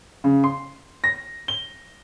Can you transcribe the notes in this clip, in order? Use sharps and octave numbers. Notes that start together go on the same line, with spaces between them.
C#3
C6
A#6
G7